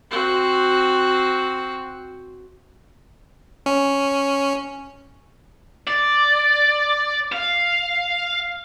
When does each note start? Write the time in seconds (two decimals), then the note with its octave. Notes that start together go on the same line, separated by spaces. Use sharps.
0.11 C4 F#4
3.66 C#4
5.87 D5
7.32 F5